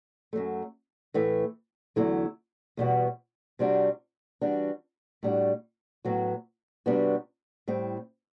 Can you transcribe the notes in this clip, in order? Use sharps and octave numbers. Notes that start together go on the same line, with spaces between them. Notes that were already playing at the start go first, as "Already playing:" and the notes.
F#2 F#3 A3
A2 E3 A3
E2 D3 F#3 A3 E4
E2 B2 G3 B3 F#4
C3 G3 D4 F#4
E3 G3 D4 F#4
A2 G3 D4 F#4
A2 F#3 B3 F#4
C3 G3 B3 D4 F#4
A2 G3 C4